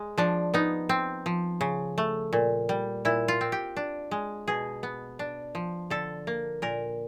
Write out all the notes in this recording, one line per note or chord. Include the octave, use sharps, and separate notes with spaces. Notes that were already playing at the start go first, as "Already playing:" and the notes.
Already playing: G#3
F3 D4
B3 D#4
C4
F3
C#3
A3
A#2
G3
A#2 E4
F4
C4
G4
D4
G#3
B2 G#4
B3
D4
F3
D3 A4
A#3
A#2 A#4